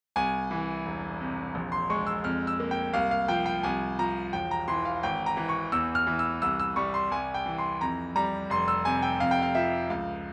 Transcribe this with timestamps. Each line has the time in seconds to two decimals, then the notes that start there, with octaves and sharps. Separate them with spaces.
0.16 C2 G#5
0.51 E3
0.86 E1
1.21 C3
1.55 A#1
1.72 C6
1.90 G#3 C#6
2.07 E6
2.24 F2 F6
2.47 E6
2.60 A#3
2.71 G5
2.94 C2 F5
3.11 F5
3.28 F3 G5
3.46 G5
3.63 C2 G#5
3.99 F3 A#5
4.33 E1 G5
4.51 A#5
4.68 E3 C6
4.85 F5
5.03 G#1 G5
5.26 A#5
5.37 E3
5.49 C#6
5.72 E2 E6
5.95 F6
6.07 E3
6.19 E6
6.42 C2 E6
6.59 E6
6.76 G3 C#6
6.94 C6
7.11 C2 G#5
7.34 G5
7.46 E3
7.58 C6
7.81 F2 A#5
8.16 G3 A#5
8.50 F1 C6
8.68 E6
8.85 C3 G#5
9.02 G5
9.20 F2 F5
9.31 G5
9.42 F5
9.55 F3 E5
9.90 C#2 F5